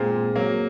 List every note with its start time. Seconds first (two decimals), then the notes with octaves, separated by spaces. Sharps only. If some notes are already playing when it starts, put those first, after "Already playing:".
Already playing: A#2 G#3 C4
0.35 F#3 A#3